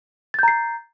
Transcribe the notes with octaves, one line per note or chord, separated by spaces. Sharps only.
A#5 G6 A6 C7